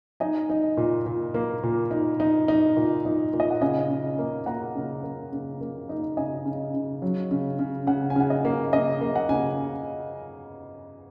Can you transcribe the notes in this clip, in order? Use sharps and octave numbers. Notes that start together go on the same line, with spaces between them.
D#4 D#5 G#5
D#4
A#2
A#2
A#3
A#2
D#4
D#4
D#4
A#2
D#4
A#2
D#5
F#5
C#3 D#5 G#5
C#3
A#3
A#3 F#5 A#5
C#3
A#3
C#3
A#3
D#4
C#3 D#5 G#5
C#3
C#3
F#3
C#3
C#3
C#3 F#5
G#5
C#3 F#5
D#5
A#3
C#3 D#5
A#3
F#5
C#3 G#5